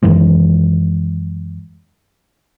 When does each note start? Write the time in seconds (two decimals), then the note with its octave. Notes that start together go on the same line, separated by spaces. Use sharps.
0.03 F#2 D#3 E3 G#3